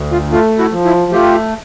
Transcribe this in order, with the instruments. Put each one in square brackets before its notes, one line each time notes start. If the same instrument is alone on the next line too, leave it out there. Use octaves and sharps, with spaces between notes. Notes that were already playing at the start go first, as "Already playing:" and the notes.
Already playing: [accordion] D2
F4
A3 F4
E4 F#4
F3
E4
A3 F4 G4